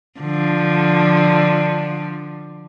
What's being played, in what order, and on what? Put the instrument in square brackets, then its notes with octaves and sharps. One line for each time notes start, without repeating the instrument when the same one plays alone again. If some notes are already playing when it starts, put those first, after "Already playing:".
[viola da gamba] D3 F3